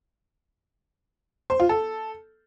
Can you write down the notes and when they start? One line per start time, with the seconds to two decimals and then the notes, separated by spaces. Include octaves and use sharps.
1.50 C5
1.60 F4
1.69 A4